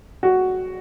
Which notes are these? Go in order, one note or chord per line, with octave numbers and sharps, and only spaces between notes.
F#4